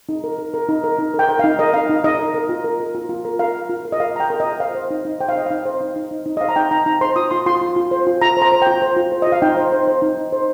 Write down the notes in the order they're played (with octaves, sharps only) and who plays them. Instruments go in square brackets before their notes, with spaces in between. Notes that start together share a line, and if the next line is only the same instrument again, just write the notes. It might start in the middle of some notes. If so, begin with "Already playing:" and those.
[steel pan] D#4
A#4
A#4
A#4
D#4
A#4
D#4
A#4
G5
A#4
D#4 F5
A#4 D#5
A#4 F5
D#4
D#4 D#5
A#4
A#4
F4
A#4
A#4
F4
F4
A#4
A#4 F5
A#4
F4
A#4
D#5
A#4 F5
A#4 A#5
G5
A#4
F4 D#5
C5 F5
C5
D#4
D#4
C5 G5
F5
C5 D#5
D#4 F5
C5
D#4
D#4
D#4
D#4
D#5
C5 F5
A#5
D#4 G5
D#4 A#5
D#4 A#5
C5 C6
F4 D#6
F4 C6
F4 C6
F4
F4
C5
F4
F4 A#5
C5 A#5
C5
F4 G5
C5
F4
C5
F4 D#5
F5
D#4 G5
C5
C5
C5
D#4
D#4
C5